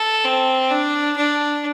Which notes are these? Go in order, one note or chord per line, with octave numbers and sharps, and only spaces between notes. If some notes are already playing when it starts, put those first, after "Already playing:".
Already playing: A4
C4
D4
D4